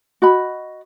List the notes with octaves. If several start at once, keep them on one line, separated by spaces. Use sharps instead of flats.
F#4 D#5 B5